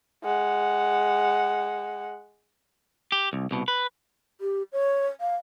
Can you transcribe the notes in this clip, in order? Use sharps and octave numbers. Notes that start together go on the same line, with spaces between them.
G#3 F#5
G4
C2
C2 B2
B4
G4
C#5
F5